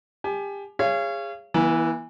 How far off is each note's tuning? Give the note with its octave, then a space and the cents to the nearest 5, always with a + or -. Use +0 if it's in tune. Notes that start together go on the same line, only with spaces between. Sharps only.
G4 +30 G#5 +35
G#4 -25 C#5 +0 F5 -30
E3 +0 B3 -45